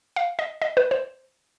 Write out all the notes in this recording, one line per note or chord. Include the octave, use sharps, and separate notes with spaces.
F5
D#5
D#5
B4
C5